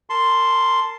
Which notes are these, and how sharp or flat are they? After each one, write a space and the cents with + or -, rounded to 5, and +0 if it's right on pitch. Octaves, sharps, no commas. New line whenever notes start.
A#4 -30 A5 +0 C6 +0